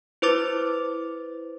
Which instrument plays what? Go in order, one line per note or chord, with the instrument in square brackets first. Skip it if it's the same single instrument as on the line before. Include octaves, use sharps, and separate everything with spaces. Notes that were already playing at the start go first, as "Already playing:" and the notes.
[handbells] E4 B4 C5 D6 A6